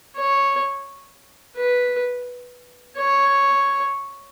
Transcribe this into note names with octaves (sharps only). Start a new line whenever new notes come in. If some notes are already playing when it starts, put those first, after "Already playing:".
C#5
B4
C#5